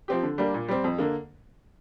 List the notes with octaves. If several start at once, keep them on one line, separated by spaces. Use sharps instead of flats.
F3 C4 G4
D3
G3 A#3 D4
A#2
G3 C4
F2
D3 A#3